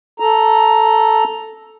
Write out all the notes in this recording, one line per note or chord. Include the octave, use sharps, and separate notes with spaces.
A4 A#5